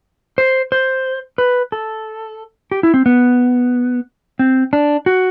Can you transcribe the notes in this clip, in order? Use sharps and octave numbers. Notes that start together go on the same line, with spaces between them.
C5
C5
B4
A4
G4
E4
C4
B3
C4
D4
F#4